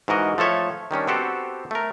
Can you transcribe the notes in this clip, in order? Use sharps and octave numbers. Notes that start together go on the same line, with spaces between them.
G#2 E3 F#4 A#4 D#5
F3 A3 A4 C#5 E5
D#3 G3 C#4 D4
B3 C4 F#4 G4 A4 C5
A3 A#4